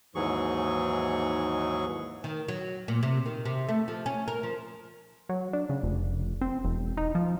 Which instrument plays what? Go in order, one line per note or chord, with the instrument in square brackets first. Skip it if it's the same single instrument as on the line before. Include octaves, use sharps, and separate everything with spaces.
[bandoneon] D#2 G#2 E3 F#3 G#4 C#6
[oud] D#3
F#3
A#2
C3
D#3
C3
A3
F3
C#4
A#4
F3
[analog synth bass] F#3
D4
C#3
F1
C4
E1
D#4
F3